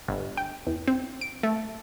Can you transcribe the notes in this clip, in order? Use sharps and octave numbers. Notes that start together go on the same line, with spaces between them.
G1
G5
E2
C4
D7
A3